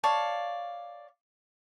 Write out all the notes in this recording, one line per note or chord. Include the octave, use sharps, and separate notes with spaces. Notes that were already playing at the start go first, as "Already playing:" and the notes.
C#5 D5 F5 A5